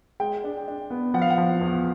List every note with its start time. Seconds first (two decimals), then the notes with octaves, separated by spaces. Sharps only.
0.20 G#3 G5
0.44 D4
0.68 D4
0.90 B3
1.14 F3 F#5
1.22 F5
1.30 F#5
1.38 F3
1.61 E2